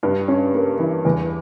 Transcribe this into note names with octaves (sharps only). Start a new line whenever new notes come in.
G2
C#4
A#3
E3
E2